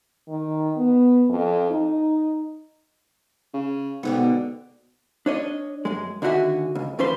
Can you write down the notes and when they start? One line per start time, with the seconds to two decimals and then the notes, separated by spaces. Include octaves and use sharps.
0.28 D#3
0.77 B3
1.30 F2
1.70 D#4
3.54 C#3
4.03 G#2 B2 D3 B3
5.26 D4 C#5 D#5
5.85 F#2 G#3
6.22 D#2 D3 D4 F#4 E5 G#5
6.75 C#2
6.99 D2 F3 C#4 B4 C5 C6